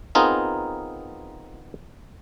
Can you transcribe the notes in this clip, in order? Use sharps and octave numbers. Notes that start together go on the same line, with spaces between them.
B3 C4 D#4 F4 G#4 A#4